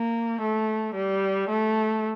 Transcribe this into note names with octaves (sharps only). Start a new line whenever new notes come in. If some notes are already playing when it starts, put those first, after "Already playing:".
Already playing: A#3
A3
G3
A3